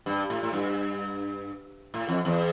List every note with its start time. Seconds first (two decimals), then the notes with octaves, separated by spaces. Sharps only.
0.06 G2
0.30 A2
0.43 A2
0.53 G2
1.94 A2
2.09 F2
2.25 E2